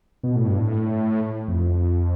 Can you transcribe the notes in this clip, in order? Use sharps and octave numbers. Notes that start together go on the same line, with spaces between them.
B2
A2
G2
A2
F2